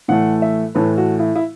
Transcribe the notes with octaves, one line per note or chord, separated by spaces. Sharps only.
A2 E3 A3 F#5
E5
A2 E3 A3 B4
F#4
E4
E4